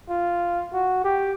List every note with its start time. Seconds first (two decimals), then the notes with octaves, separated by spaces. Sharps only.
0.09 F4
0.73 F#4
1.04 G4